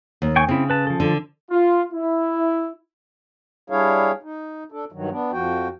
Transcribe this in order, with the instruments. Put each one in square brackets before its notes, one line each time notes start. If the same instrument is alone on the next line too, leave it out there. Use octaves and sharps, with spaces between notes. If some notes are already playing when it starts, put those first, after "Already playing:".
[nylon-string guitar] D#2
[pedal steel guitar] G5 G#5 C#6
[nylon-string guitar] C#3 [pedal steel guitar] C4 E4
[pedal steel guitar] B4 A5
F3 A4
[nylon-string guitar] D3
[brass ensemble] F4
E4
[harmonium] G3 D4 E4 G#4 C#5 F5
D#4
D4 A4
G2 D#3 F#3
B3 D4
F2 F3 F#4 G5